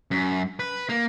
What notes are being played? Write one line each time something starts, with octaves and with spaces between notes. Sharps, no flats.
F#2
B4
A#3